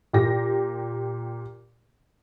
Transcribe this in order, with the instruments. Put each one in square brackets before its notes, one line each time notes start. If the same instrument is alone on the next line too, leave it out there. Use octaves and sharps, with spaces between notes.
[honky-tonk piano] A#2 G4 A#6